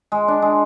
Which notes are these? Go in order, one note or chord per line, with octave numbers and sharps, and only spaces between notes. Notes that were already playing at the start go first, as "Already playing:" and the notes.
G#3
D4
G#3